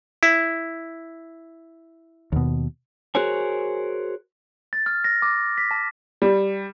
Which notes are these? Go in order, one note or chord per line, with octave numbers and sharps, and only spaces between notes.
E4
D#2 B2
F#4 G#4 A#4 C5 C#5 G#5
A6
F6
A#6
D6
B6
A5
G3